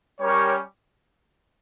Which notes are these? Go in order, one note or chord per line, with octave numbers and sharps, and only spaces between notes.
G3 C#4 G4 A#4 C#5